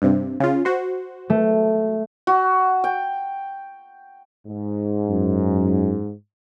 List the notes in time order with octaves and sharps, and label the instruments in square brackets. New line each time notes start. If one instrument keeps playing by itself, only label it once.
[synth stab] G2 C3
C#3 F4
F#4 C5
[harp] A3
[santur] F#4
G5
[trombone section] G#2
[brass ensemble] F#2